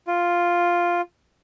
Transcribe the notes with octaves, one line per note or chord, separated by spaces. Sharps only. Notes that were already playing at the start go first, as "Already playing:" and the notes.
F4